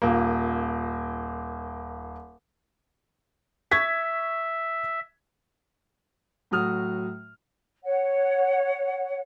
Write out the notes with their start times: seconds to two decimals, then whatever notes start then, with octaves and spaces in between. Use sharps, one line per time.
0.02 D#1 A#3
3.72 E5 C#6 G#6 B6
6.51 A2 F#3 F#4 D#6 F6
7.84 C#5 F#5